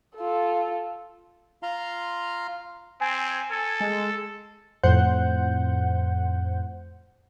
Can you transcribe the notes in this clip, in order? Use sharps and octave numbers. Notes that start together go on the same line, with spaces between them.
F4 A4
F4 F5 A#5 C6
C4 G#5
A4
G#3
F2 A2 C5 F#5 G6